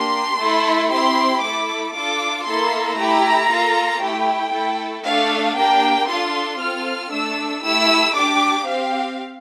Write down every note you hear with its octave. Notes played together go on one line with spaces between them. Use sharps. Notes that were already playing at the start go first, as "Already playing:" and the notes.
Already playing: A#3 D4 G4 C6
A3 E4 A4
C4 E4 G4 C6
A3 E4 A4 D6
D4 F4 A4 D6
A#3 E4 A4 C6
A3 E4 G4 A#5
A#3 F4 A4
A3 E4 G4 G5
A3 E4 A4
A3 D4 A4 F5
A#3 D4 G4 G5
D4 F4 A4 C6
C4 F4 A4 F6
A3 D4 A4 E6
A3 E4 G4 E6
D4 G4 D6
C4 G4 F5